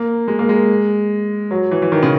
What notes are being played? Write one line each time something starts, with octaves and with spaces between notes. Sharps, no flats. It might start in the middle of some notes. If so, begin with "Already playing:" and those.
Already playing: A#3
G#3
A#3
G#3
F#3
E3
E3
D#3
C#3